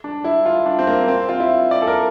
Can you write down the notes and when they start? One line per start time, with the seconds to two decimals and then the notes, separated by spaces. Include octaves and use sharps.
0.04 D4
0.24 E4
0.46 F4
0.66 D4
0.79 C4
0.87 A#3
1.08 C4
1.29 F4
1.40 E4
1.71 D5
1.82 A4
1.87 A#4